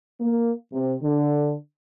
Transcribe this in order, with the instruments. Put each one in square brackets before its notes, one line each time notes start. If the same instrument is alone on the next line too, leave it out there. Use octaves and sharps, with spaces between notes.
[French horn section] A#3
C3
D3